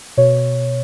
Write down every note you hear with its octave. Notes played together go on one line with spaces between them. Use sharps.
B2 C#5